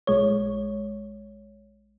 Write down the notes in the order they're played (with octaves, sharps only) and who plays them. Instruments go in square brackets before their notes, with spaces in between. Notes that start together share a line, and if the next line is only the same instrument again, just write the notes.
[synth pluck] A#1 G#3 C#5